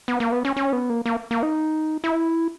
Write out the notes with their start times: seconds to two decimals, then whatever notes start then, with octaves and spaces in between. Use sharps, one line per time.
0.08 B3
0.20 A#3
0.32 B3
0.45 C#4
0.57 C#4
0.73 B3
0.90 A#3
1.06 A#3
1.31 A#3
1.43 D#4
2.04 E4